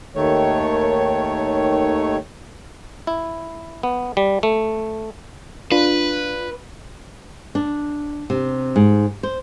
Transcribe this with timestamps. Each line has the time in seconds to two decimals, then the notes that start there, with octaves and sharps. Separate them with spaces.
0.15 D#2 D#3 A3 C#5
3.07 E4
3.83 B3
4.17 G3
4.43 A3
5.72 D4 F4 B4
7.55 D4
8.30 C3
8.76 G#2
9.23 C5